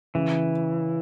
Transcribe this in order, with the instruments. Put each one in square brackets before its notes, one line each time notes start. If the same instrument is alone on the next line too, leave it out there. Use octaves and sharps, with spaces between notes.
[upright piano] C#3 [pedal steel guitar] E3